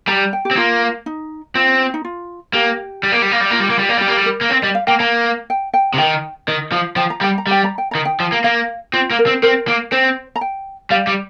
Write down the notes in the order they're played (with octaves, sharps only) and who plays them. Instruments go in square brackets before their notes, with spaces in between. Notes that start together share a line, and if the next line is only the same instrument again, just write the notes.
[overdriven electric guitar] G3 [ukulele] A#5
[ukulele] G5
G4
[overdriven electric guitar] C4
[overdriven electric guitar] A#3 [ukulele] F4
[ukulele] D#4
[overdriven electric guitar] C4 [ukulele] F4
[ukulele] D#4
F4
[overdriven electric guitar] A#3 [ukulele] G4
[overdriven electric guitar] G3
A#3
G3
A#3
G3
[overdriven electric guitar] A#3 [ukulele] F4
[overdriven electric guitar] G3
A#3
G3
A#3
[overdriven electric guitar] G3 [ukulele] G4
[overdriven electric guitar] A#3
G3
[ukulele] A#4
[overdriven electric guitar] A#3
[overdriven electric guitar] C4 [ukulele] C5
[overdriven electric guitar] G3 [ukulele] D#5
[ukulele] F5
[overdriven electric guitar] A#3 [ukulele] G5
[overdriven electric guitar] A#3 [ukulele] A#5
[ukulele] G5
G5
[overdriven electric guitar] C3
[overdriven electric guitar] D#3 [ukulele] G5
[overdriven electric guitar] D#3 [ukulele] D#5
[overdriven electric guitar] F3
[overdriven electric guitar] F3 [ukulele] G5
[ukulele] A#5
[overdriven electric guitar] G3 [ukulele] G5
[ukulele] A#5
[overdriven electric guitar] G3 [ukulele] G5
[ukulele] A#5
G5
[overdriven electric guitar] D#3 [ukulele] A#5
[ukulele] G5
[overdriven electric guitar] F3
A#3
[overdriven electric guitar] A#3 [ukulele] F5
[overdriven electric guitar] C4 [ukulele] F4
[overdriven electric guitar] A#3
[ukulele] A#4
[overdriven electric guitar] C4
[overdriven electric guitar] C4 [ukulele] A#4
[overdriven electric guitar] A#3
[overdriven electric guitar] C4 [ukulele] C5
[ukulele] A#5
G5
[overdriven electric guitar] G3 [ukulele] F5
[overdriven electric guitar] G3